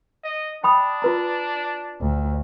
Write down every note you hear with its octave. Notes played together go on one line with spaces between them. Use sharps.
D#5
D4 G5 B5 D#6
F4 B4 A#5
D2